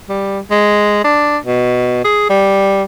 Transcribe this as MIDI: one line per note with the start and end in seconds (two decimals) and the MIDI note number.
0.09 0.40 55
0.51 1.01 56
1.04 1.38 62
1.45 2.00 47
2.04 2.27 68
2.30 2.83 55